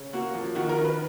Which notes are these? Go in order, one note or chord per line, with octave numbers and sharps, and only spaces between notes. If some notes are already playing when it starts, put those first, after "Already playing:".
Already playing: C#3
A#3 F#4
F3
D#3 F#4
A#4
D#3
B4